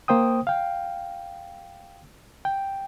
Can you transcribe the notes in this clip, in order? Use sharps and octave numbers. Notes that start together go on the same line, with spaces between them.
A#3 C5 G5 D#6
F5 G5
G5